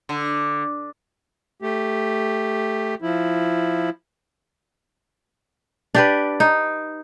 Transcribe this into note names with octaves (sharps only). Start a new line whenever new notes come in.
D3
A3 G4
F3 E4
D4 G4 B4
D#4